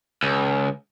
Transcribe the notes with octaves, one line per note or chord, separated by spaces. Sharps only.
C#2